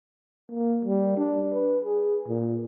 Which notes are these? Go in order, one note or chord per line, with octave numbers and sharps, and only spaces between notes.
A#3
G3
D4
B4
G#4
A#2